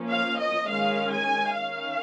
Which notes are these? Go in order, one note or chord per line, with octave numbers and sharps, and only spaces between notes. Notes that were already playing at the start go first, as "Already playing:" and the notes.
Already playing: F3 A#3 C#4
F5
D#5
D#3 G#3 C#4 F5
G#5
D#3 C#4 F5